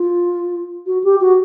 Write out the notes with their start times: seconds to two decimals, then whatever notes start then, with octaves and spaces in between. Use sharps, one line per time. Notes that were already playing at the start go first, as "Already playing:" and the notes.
Already playing: F4
0.86 F#4
1.04 G4
1.20 F#4